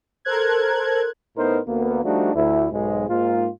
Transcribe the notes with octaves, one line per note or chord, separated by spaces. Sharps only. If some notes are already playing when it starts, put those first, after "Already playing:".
A4 A#4 C5 F#6 G#6
A2 B3 D#4 A#4 C5
D2 A#3 B3
F3 G3 A3 D4 D#4 F#4
D2 E4
B1 G#2 G#3
G#2 A#3 F4